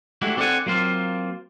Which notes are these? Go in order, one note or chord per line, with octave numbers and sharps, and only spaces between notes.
G#3 A3 D4 E4 F#4 G4
C4 A4 D5 E5 F#5 G#5
F#3 A#3 C4 F4